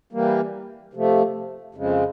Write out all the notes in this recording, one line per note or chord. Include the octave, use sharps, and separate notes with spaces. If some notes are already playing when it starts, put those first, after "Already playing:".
E3 G3 A#3
C3 F3 A3
F2 C#3 F3 G#3